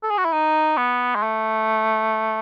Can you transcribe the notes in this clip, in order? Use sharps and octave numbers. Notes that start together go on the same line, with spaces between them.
A4
G#4
F#4
E4
D#4
B3
G#3
A3